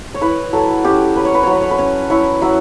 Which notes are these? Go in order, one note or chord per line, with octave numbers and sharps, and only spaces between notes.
C#5
E4 B4
F#3 A4
C#4 G4
F#3 B4
C#5
B4
F#3 C#5
B4
C#5
B4
C#4
E4 C#5
F#3 E5